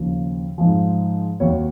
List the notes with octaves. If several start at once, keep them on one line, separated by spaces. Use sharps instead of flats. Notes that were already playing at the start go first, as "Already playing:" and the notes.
Already playing: D#2 C#3 F3
G#2 F3
D#2 D#3 F#3 C#5